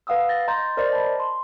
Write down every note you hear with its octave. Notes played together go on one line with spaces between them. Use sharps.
B4 F5 F#5 D#6 E6
A6 A#6
D#5 A#5 C6 G6 A6
A#4 C5 D5 D#5 A6
A5 B5
C6